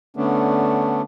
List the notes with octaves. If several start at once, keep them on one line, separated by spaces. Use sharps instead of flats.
D3 A3 B3 C#4 D4